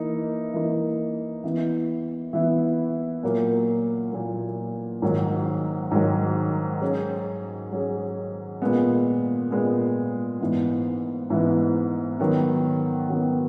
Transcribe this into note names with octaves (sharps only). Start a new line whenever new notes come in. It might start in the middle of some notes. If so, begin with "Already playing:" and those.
Already playing: E3 A#3 D#4
E3 A#3 D#4
E3 B3 E4
E3 B3 E4
A#2 F#3 A#3
A#2 F#3 A#3
G#2 D#3 F#3
G#2 D#3 F#3
F#3 C#4 G#4
F#3 C#4 G#4
A#2 G#3 B3
A#2 G#3 B3
G#2 E3 B3
G#2 E3 B3
D#3 F#3 B3
D#3 F#3 B3